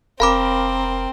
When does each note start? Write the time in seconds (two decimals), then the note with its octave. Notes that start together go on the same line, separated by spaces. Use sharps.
0.20 F1 C4 A#4 F5 B5 D6